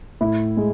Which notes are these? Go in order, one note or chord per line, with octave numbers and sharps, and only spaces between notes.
A2 E4
G#3